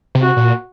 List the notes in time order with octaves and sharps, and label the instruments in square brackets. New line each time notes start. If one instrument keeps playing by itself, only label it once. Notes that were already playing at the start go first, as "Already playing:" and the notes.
[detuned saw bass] C3
[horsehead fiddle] F#4
[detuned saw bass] A#2